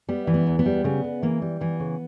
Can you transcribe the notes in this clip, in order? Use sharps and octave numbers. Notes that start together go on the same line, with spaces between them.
G3 B3
E3
B3
E2
B3
G3
C#3 B3
C#3
E3 A#3
G3
E3 B3
C#3